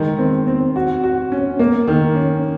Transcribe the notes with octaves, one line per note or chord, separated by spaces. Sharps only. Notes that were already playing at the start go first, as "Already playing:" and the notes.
Already playing: D#3 G#3
C4
C4
F#4
F#4
C#4
A#3
D#3
C#4